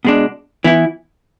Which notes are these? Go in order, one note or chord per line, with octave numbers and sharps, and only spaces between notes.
B2 G#3 D4
E3 B3 E4